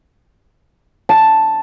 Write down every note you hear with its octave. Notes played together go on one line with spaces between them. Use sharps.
A5